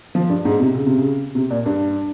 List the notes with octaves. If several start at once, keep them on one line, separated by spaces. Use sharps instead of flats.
F3
G2
G#2
C3
C#3
C3
C#3
C3
A#2
G2